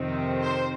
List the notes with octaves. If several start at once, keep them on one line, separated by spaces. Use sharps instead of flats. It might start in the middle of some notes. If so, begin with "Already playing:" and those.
Already playing: F2 C3 D#3 C4
C5